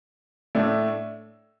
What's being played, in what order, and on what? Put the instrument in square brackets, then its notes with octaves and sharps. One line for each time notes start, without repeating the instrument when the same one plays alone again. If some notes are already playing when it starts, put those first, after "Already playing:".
[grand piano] A2 A3 D4